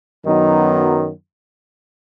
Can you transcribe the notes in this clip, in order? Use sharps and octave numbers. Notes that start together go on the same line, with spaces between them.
F#2 D#3 F#3 B3 D#4